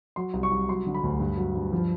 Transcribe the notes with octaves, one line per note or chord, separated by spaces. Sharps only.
F#3 C6
C2
C#6
C2
F#3 C6
D3
B5
D2
G2
F#3
G2
F3